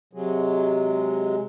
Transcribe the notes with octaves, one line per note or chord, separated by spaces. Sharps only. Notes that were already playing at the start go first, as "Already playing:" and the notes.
C3 F#3 G#3